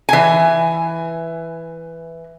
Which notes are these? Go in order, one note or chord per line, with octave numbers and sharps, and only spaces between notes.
E3 G#5